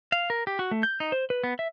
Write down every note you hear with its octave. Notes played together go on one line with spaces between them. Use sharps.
F5
A#4
G4
F#4
A3
G6
D#4
C5
B4
B3
E5